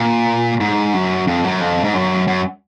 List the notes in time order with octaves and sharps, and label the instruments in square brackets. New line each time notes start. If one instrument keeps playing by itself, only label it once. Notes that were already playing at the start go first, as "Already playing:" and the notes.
Already playing: [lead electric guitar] A#2
G#2
F#2
F2
F#2
F2
G#2
F#2
F#2